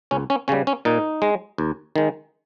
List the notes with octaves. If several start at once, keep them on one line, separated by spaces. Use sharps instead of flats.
C#2 C#4
C#4
C#3 G3 C#4
C#4
A#2 D#4
G#3
D#2
D#3 G#3